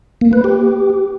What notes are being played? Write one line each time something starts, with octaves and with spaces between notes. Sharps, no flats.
A#3
B4
G4